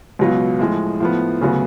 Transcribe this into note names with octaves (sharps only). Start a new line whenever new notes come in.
C#2 B2 F#3 B3 F4
A2 F3 G#3
A2 F3 B3
D2 C#3 F#3 B3